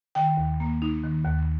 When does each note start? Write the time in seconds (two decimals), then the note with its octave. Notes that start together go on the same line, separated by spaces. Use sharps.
0.15 D#3 G5
0.37 D#2
0.60 A#3
0.82 D#4
1.03 D#3
1.25 D#2